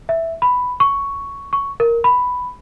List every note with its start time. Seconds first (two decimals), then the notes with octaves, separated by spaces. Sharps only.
0.09 E5
0.42 B5
0.80 C#6
1.53 C#6
1.80 A#4
2.04 B5